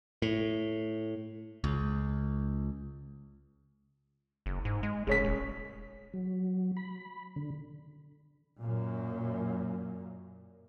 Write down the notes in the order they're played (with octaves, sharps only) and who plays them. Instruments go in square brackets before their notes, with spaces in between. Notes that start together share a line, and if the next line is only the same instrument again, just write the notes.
[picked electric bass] A2
C#2
[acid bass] F#1
G#2
G#3
[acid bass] F#1 [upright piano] G#3 C#4 B6
[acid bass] D#1
[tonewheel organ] F#3
B5
D3
[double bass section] F#2 A#2